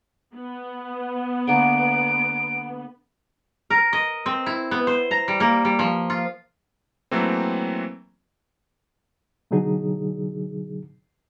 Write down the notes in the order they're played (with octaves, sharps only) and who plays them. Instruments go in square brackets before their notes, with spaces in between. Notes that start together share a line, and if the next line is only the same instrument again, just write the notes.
[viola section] B3
[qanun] D3 A#3 [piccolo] D7
[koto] A#4
D#5
C4
E4
B3
C5
A#5
G3
A#3
G3
F3
F4
[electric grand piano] E3 F#3 A3 A#3 C4
[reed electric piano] B2 D3 F#3 D#4 G#4